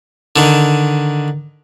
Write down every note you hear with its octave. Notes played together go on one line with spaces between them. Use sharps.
D3 D#3